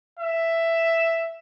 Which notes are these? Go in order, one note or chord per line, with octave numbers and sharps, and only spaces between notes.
E5